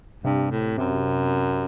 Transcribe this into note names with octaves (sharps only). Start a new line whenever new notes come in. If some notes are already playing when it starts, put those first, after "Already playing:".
G2 C3
A2
F#2 C3